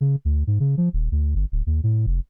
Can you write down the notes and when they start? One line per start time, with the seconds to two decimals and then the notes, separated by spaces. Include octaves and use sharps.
0.01 C#3
0.25 D2
0.47 G#2
0.60 C#3
0.77 F3
0.93 D#1
1.12 D2
1.35 G1
1.52 D1
1.67 D#2
1.83 A2
2.06 F1